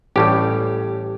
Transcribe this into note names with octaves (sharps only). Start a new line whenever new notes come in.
A1 A2 G3 G4